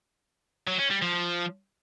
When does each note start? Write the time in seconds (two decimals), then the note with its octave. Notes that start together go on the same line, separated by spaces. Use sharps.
0.67 F#3
0.79 C#4
0.91 G3
1.02 F3